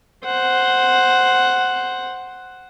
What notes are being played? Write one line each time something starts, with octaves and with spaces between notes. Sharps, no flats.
C5 F#5